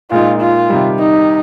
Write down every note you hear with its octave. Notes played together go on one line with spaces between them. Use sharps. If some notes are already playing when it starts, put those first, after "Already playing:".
A#2 G#3 D#4 F4
F4
C3 D#3 G3
D#4